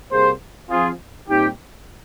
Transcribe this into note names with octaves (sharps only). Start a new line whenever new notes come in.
C3 G3 A#3 G#4 C5
F3 C4 F4 G#4
A#2 G3 C4 D#4 G4